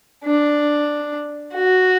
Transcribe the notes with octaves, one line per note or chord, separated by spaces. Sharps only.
D4
F#4